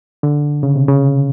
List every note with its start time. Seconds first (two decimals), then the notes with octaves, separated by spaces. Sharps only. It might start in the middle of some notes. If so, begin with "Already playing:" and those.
0.23 D3
0.63 C#3
0.76 C3
0.88 C#3